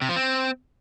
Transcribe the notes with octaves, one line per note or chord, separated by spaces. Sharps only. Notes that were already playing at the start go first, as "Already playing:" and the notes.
C3
F3
C4